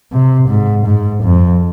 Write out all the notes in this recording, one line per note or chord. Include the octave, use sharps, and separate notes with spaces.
C3
G#2
G#2
F2